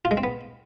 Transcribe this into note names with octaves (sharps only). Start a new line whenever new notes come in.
F4
G#3
C4
B3